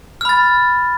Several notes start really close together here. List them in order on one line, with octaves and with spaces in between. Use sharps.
F6 B5 A6